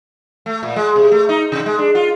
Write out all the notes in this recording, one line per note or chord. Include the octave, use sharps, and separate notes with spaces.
A3
A#2
G#3
C3
A3
D#4
C3
G#3
D4
F4